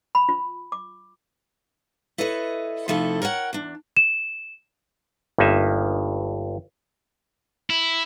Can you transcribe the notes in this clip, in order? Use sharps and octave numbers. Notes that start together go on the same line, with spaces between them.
B5
F4
D6
E4 A4 B4 C#5 D#5
C3 F3 A3 D#4 E4 A4
A#4 C#5 D5 F#5 G5
E2 D4
E7
G1 G2 A#3 D#4 E5
E4